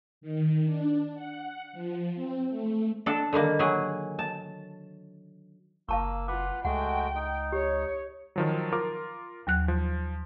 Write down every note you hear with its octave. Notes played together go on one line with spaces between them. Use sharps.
D#3
D4
F#5
F3
C4
A3
D4 A4
D3 D#3 G3 A#3
F#3 G#4
A5
F#1 A#3 F5 A5 C#6 E6
F4 B4 F#5 D6
C#2 G#3 A3 F#4 F#5 G5
D#4
G4 C#5
D#3 F3 F#3
F4 A#4 D6
D#2 F#3 F#6
F3